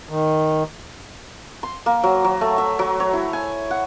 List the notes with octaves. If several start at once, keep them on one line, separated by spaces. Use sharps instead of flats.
D#3
C6
A#3
F#3
F#3
A3
E5
F#3
C#5
E4
G#5
F#5